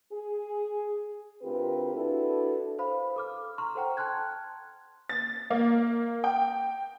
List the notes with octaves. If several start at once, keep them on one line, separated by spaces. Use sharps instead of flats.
G#4
D2 C4 F4 G4 A#4 B4
D4 E4 F#4 A4 B4
A4 C5 F5 B5
A4 D6 F6
A#5 C6 C#6 F6
A4 C5 F#5 G5 A#5
G5 A5 C6 F6 F#6 G#6
A6
A#3
G5